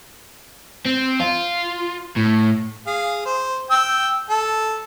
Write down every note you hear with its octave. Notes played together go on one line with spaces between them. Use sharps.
C4
F4
A2
G#4 F5
C5
G5 E6
A4